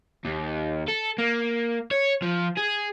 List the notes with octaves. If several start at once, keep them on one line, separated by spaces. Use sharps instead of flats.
D#2
A4
A#3
C#5
F3
G#4